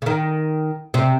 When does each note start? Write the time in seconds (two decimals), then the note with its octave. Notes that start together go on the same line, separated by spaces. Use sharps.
0.02 C#3
0.06 D#3
0.94 C3